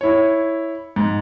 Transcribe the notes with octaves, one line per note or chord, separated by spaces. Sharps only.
E4 C#5
G#2